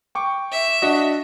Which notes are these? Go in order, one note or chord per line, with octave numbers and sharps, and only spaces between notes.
G5 C#6 D6
E5
D4 F#4 D#5